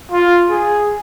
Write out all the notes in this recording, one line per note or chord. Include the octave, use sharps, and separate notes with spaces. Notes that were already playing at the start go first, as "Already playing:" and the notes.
F4
G#4